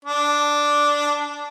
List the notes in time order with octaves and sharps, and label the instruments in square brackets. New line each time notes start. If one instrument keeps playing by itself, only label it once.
[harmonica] D4